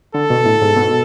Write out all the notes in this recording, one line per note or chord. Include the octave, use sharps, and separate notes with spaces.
D3 A4
B2
A2
G#2
B2